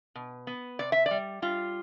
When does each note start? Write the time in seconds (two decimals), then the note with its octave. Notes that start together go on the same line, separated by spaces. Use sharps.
0.15 B2
0.47 B3
0.79 C3 D5
0.92 E5
1.06 D5
1.11 G3
1.42 G3 F4